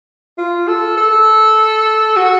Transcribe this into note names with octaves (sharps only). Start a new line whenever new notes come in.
F4
A4
A4
F#4